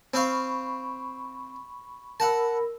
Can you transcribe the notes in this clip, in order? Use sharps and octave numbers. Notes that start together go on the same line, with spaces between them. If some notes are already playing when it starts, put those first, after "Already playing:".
C4 F5 B5 C#6
A#4 F#5 A5 B5 E6